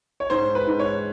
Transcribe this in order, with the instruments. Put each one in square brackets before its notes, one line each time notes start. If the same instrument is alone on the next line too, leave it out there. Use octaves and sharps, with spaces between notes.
[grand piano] C#5
G#2 C5
B4
G#2
C#5